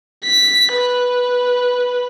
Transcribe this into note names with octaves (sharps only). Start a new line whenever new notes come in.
B6
B4